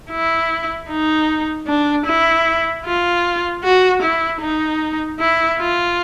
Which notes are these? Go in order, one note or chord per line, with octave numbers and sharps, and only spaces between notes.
E4
D#4
D4
E4
F4
F#4
E4
D#4
E4
F4